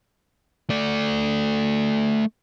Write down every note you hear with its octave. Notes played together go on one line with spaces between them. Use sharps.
A3 D5